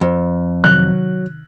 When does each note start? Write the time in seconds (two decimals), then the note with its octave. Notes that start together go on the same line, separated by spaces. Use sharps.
0.01 F2
0.64 C3 D#3 F#3 F#6